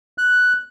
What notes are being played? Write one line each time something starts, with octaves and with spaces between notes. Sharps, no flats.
F#6